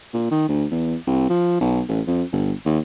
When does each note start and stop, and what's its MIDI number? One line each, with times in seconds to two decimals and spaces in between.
0.14 0.28 46
0.31 0.47 51
0.49 0.65 38
0.71 0.95 40
1.07 1.29 36
1.30 1.59 53
1.61 1.83 35
1.89 2.01 33
2.07 2.23 41
2.33 2.53 31
2.66 2.79 39